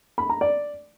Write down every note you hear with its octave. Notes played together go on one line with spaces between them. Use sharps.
B5
A#5
D5